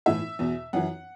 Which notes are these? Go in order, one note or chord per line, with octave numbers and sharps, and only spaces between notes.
A2 E3 E5
E2 B2
F#2 E3 F#5